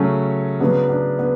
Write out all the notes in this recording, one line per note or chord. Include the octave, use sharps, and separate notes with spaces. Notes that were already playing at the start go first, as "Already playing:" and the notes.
Already playing: C#3 F#3 A3 C#4
C#3 F#3 B3 D4
B3 D4
B3 D4